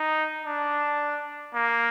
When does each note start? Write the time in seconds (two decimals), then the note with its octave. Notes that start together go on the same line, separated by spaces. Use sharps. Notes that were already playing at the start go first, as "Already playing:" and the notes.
Already playing: D#4
0.44 D4
1.54 A#3